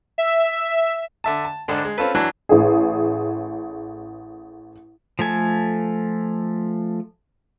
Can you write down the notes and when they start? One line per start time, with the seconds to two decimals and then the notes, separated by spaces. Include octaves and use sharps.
0.18 E5
1.24 D3 E5 A5
1.45 A5
1.68 G#1 D3 D4
1.85 G#3
1.98 C4 C#4 F4 A4 B4
2.15 E3 F#3 D4 A5 F#6
2.49 A1 G#4
5.19 F3 A3 A4 G#5